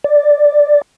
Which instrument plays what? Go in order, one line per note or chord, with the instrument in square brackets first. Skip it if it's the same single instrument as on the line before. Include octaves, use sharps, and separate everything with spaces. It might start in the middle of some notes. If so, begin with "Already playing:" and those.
[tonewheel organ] D5